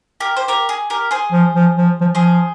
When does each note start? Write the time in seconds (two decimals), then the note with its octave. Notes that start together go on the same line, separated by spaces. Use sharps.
0.20 G4 A#4
0.37 C5
0.48 G4 A#4
0.69 G#4
0.90 G4 A#4
1.11 G#4 C5
1.32 F3
1.55 F3
1.77 F3
2.01 F3
2.15 F3 G#4 C5